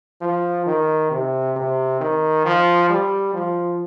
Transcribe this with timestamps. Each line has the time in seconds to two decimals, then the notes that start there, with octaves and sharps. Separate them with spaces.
0.21 F3
0.66 D#3
1.11 C3
1.56 C3
2.01 D#3
2.45 F3
2.90 G3
3.34 F3